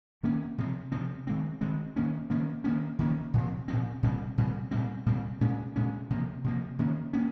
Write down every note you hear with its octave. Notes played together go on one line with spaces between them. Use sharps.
D#3 A#3 C#4
C3 F3 C4
C3 F3 C4
D#3 G#3 C4
D#3 G#3 C4
D#3 A#3 C#4
D#3 A#3 C#4
D#3 A#3 C#4
D#3 A#3 C#4
A#2 F3 C4
A#2 F3 C4
A#2 G3 C4
A#2 G3 C4
A#2 G3 C4
A#2 G3 C4
A#2 G#3 C#4
A#2 G#3 C#4
C3 F3 A#3
C3 F3 A#3
D#3 A#3 C#4
A#3 C#4